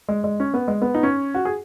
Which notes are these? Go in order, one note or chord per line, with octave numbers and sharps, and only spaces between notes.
G#3
G#3
C#4
B3
G#3
B3
D#4
C#4
F#4
G#4